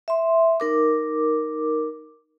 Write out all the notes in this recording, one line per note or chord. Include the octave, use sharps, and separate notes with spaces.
E5 C6
D#4 A#4 D6